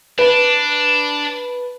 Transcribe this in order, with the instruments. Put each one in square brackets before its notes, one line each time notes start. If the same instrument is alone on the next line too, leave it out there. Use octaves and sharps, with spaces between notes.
[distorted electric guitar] D4 [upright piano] B4